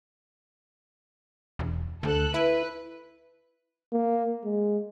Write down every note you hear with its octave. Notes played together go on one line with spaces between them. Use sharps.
E1
D2 A4 F#6
E4 B4
A#3
G#3